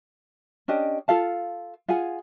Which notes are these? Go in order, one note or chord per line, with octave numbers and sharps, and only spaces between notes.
C#4 D4 G4 D#5
F4 A4 F5 A5
F4 G#4 F#5 G#5